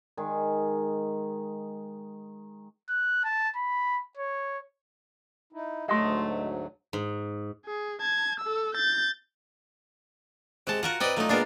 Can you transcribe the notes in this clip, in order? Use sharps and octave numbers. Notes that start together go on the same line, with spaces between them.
D#3 G#3
F#6
A5
B5
C#5
D#4 E4
D2 G#2 F#3 A3 D#5 C6
G#2
G#4
A5 G#6
A4 E6
G6 A6
C3 G#3 F#4 A5
F4 F#4 A#4 F#5
C4 B4 D5 D#5 G5
F#3 A3 D#4 F4
A#2 G#3 B3 D4 F4 A#4